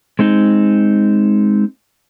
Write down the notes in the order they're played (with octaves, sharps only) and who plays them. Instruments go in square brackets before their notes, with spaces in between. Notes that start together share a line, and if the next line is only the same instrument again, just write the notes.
[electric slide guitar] G#3 C4 D#4